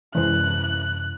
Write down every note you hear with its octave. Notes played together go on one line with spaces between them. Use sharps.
F#2 C3 E3 G#3 C#4 C5 F#6